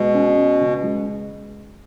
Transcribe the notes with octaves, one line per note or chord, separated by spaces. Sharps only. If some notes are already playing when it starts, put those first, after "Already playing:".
Already playing: B2 G#3
C#4
C#4
C#3
G#3